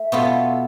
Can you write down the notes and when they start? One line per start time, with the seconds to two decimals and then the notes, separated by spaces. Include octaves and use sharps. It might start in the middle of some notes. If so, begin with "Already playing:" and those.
Already playing: A3
0.12 B2 B3 F4 A4